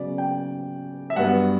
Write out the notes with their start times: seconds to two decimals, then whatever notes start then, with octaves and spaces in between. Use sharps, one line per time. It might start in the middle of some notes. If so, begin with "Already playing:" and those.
Already playing: C#3 F#3 B3 D5
0.18 G5
1.10 E5
1.16 G2 F#3 B3 F#5